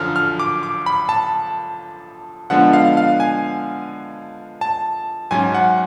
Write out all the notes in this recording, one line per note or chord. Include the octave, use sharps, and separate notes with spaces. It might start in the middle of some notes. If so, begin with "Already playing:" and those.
Already playing: F#2 D3 F3 F6
F6
D6
D6
B5
A5
D3 F3 G#3 B3 D4 F#5
F5
F5
G#5
A5
G#2 F#3 C#4 G#5
F#5